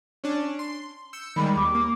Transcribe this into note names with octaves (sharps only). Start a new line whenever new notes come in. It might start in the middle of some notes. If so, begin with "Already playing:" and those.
C#4 D4
C6
E6 G6 C#7
D#3 G3 G#3 B5
D#2 D6
A#3